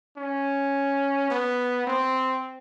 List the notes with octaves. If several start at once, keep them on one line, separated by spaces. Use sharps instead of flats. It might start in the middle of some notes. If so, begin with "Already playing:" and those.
C#4
B3
C4